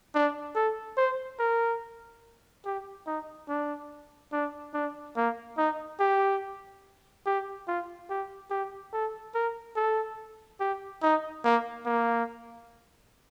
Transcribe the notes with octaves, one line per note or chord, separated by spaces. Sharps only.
D4
A4
C5
A#4
G4
D#4
D4
D4
D4
A#3
D#4
G4
G4
F4
G4
G4
A4
A#4
A4
G4
D#4
A#3
A#3